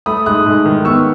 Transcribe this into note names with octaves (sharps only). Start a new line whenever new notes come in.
A3 B5 D#6
G#2 D#6 F#6
G#2
D#3
B3 C#6 E6